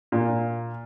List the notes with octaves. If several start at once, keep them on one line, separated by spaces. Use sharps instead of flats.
A#2